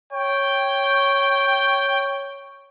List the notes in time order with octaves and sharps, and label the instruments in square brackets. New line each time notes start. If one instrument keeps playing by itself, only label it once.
[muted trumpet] C#5 [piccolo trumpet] G5